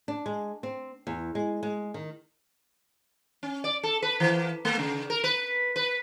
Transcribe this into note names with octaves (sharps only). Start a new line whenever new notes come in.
D4
G#3
C4
E2
G#3
G#3
D#3
C#4
D5
A4
B4
E3
A3
C#3
A#4
B4
B4